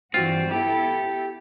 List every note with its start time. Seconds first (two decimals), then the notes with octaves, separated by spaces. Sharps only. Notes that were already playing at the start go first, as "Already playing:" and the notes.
0.14 G2 E3 C4 F4 F#4
0.51 B3 E4 G4 A4